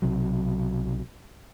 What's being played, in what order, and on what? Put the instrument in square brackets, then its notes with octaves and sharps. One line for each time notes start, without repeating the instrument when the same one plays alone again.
[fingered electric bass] B1 C3 F#3